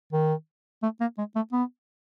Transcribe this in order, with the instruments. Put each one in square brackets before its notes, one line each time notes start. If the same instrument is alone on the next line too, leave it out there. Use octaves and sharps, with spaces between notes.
[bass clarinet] D#3
A3
A#3
G#3
A3
B3